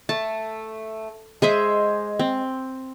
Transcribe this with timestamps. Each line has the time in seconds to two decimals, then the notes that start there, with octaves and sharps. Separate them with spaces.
0.09 A3 A5
1.42 G#3 G#4 C5 E5
2.19 C4